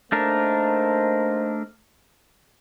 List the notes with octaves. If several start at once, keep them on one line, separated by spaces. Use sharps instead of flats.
A3 A#3 D4 D#4 A#4 C5